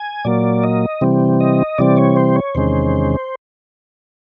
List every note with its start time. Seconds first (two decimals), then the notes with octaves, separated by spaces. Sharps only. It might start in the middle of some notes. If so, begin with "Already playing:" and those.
Already playing: G#5
0.25 A#2 F#3 A#3 D5
0.63 D#5
1.01 C3 E3 G3 C4
1.40 D#5
1.78 C3 E3 G3 C4 D5
1.97 C#5
2.16 C5
2.36 C#5
2.55 E2 C3 D#3 G#3 C#4 C5